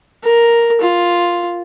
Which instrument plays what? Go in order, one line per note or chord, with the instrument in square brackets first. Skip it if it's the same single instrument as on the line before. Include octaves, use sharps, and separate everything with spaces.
[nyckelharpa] A#4
F4